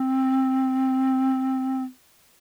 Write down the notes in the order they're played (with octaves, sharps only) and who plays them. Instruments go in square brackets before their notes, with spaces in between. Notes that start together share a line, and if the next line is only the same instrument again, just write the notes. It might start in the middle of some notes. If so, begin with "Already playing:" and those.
Already playing: [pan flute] C4